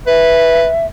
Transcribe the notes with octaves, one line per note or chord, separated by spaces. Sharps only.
B4 E5